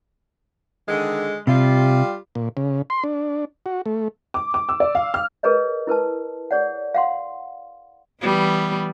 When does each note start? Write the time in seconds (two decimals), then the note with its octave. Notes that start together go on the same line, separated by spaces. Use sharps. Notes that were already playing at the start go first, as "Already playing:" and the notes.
0.88 D3 D#3 G#3
1.47 C3 G3 F4
2.35 A#2
2.57 C#3
2.90 C6
3.04 D4
3.66 F#4
3.86 A3
4.34 D6
4.54 D6
4.69 E6
4.80 D5
4.95 F5
5.14 F6
5.43 G#4 A#4 B4 C#5 D#5
5.87 E4 A#4 B4 A5
6.51 G#4 C#5 D5 F#5
6.94 F5 F#5 C6
8.21 E3 G3 B3